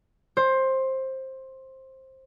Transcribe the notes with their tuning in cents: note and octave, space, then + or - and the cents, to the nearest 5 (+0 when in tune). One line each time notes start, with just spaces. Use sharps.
C5 +15